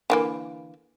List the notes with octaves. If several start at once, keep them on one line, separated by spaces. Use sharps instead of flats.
D3 E3 A#3